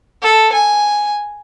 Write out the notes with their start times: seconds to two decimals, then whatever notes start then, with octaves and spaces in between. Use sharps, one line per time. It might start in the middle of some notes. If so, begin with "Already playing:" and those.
0.22 A4
0.52 G#5